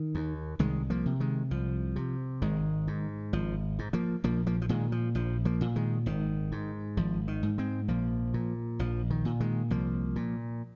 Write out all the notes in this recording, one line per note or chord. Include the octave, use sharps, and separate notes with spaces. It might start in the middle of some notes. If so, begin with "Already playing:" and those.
Already playing: D#3
D#2
C2 D#3 G#3
F3 A#3
C3
D#3 G#3
C2 F3
C3
G#1 D#3 G#3
G#2
G#1 F3
G#2
F3 A#3
A#1 F3 A#3
F3 A#3
F3
A#2 D#3 G#3
F3
A#1 F3
F3 A#3
A#2
D#3 G#3
G#1 D#3
G#2
G#1 F3
D#3
G#2
G#3 C4
A#1 F3 A#3
A#2
A#1 F3
D#3
A#2
D#3 G#3
C2 F3 A#3
A#2